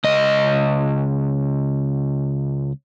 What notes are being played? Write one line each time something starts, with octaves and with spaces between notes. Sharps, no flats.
C#2 D#5